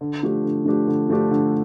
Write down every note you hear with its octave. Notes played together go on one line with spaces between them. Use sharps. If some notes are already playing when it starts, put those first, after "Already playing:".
D3
F3 A3 D4 G4
D3
F3 A3 D4 G4
D3
F3 A3 D4 G4
D3